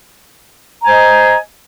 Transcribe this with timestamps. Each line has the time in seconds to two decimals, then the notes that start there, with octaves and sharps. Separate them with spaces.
0.82 A#5
0.85 G#5
0.88 C5
0.92 D#5